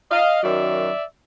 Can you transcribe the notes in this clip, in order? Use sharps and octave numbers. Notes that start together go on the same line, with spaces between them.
D#5 F5
F#2 D#3 F#3 D5 E5